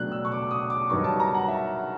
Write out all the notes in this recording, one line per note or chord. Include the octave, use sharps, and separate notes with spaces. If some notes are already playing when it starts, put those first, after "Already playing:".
Already playing: B2 F#3 A3 D4 F#6
E6
C#6
D6
D#6
D6
G2 D#3 F#3 B3 D#4 C#6
A5
A#5
F#5
E5
F#5